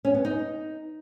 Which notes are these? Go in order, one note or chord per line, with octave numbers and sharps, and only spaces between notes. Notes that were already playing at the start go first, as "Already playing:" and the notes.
C#4
B3
D#4